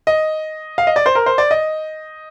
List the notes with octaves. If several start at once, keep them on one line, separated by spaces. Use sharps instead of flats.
D#5
F5
D#5
D5
C5
A#4
C5
D5
D#5